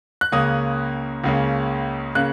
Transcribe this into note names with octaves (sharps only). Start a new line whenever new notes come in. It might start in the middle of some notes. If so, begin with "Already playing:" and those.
F#6
C#2 C#3 A#3 C#4 D#6
C#2 C#3 A#3 C#4
C#3 A#3 C#4 F#6